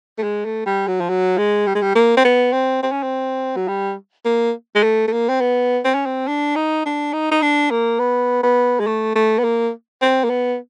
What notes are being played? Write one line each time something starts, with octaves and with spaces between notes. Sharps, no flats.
A3
G#3
A3
G3
F#3
F3
F#3
G#3
G3
G#3
G3
A#3
C4
B3
C4
C4
C#4
C4
F#3
G3
A#3
G#3
A3
A3
A#3
C4
B3
C4
C#4
C4
D4
D#4
D4
D#4
D#4
D4
A#3
B3
B3
G#3
A3
A3
B3
A#3
C4
A#3
B3